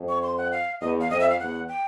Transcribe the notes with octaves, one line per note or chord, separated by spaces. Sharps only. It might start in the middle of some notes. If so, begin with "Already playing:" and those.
Already playing: F2
C#6
C6
F#5
F5
E2 D#5
F5
F2 D#5
E5
F5
E2 F#5
G5